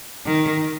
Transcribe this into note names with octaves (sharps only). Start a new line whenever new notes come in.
D#3